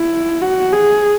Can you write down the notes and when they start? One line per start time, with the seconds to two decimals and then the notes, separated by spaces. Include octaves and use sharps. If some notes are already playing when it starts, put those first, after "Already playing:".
Already playing: E4
0.42 F#4
0.72 G#4